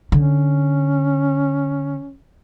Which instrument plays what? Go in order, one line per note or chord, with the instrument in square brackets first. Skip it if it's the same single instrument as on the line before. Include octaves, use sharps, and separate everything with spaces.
[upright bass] D3 [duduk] C#4